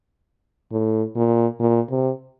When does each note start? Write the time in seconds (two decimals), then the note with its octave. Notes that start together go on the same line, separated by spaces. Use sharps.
0.72 A2
1.16 A#2
1.60 A#2
1.90 C3